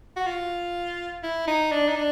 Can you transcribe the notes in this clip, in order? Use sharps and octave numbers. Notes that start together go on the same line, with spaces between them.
F#4
F4
E4
D#4
D4
D#4
D4